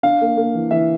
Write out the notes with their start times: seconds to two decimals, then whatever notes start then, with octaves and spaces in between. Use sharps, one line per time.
0.03 D4 F5
0.21 A#3
0.37 A#3
0.54 E3
0.71 E3 E5